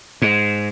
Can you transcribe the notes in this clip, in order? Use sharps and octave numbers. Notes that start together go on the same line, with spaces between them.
G#2